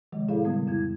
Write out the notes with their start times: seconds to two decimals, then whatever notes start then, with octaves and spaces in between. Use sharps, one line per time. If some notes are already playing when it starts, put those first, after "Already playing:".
0.12 C3 D#3 F3 G#3
0.28 A2 E4 G#4 A4 C#5 F5
0.45 C#3 G3 B3
0.67 F2 E4 G#6